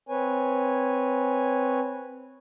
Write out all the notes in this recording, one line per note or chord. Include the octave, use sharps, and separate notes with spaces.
C4 B4 C#5 G#5